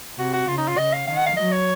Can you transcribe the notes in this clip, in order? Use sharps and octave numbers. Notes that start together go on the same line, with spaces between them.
C3 F#4
F#4
C#3 F4
D#4
F4
C#3 D#5
F5
D#3 F5
F#5
F5
F#3 D#5
C#5